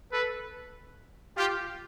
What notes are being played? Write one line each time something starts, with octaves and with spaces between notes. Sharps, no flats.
A4 B4
F4 G4